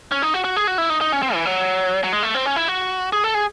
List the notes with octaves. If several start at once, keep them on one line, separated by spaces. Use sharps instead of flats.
C#4
D#4
F#4
F#4
G#4
F#4
E4
D#4
D#4
C#4
C4
E3
F#3
F#3
G#3
A3
C4
C#4
E4
F#4
G#4
A4
G#4